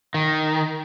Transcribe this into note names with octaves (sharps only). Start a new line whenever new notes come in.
D#3